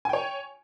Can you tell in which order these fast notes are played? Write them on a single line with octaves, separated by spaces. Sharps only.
G#5 G5 C#5